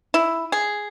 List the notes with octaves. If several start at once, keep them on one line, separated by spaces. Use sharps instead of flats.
E4
G#4